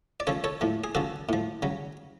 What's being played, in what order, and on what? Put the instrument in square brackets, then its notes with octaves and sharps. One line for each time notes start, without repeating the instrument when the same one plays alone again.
[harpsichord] D5
C#3 F3 A4 C#5
A4 C#5
A2 F3
G#4
C#3 F3 F#4 A4
A2 F3
C#3 F#3